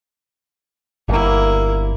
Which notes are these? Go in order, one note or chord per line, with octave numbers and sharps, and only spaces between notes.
G1 A#3 E4